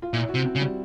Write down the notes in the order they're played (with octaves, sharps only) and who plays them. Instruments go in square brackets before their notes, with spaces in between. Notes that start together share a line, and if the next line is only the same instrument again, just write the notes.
[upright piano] F4
[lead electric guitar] A#2 [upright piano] E4
[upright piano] F#4
[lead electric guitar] C3
[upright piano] C4
[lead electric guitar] C#3
[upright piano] G3